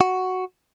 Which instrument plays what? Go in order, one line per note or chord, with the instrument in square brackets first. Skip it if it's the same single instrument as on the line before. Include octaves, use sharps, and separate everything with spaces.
[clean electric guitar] F#4